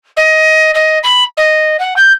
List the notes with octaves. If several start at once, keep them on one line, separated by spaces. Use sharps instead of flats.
D#5
D#5
B5
D#5
F#5
G6